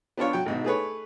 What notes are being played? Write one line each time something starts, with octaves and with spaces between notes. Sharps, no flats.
B3 D4 F4 C#5
F#3 G5
G#1 G#2 B2
A3 G#4 B4 C#5